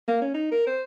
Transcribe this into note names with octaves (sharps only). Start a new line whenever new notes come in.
A#3
C#4
D#4
A#4
C5